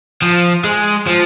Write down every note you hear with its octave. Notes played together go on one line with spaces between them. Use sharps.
F3
G#3
F3